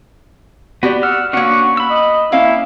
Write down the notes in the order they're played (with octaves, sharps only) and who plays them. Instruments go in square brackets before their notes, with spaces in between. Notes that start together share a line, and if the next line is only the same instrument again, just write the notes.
[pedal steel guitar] B3 [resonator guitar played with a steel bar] F#4 G4 D5
[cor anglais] F#5 [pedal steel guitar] E6 F6
[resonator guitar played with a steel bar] A#3 B3 [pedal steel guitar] C#4 D4 F#5 [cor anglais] F#4
[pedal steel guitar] B5 E6
[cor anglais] D#5
[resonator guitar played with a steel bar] A#3 C#4 F5 [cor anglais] E4